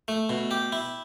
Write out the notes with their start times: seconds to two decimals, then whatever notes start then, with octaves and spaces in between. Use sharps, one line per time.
0.08 A3
0.29 B2
0.51 G4
0.72 E4